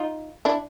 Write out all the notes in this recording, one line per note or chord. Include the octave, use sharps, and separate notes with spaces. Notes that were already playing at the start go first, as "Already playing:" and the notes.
Already playing: D#4 F4
D4 E4